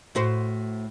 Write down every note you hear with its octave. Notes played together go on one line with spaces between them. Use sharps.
A2 F#4 C5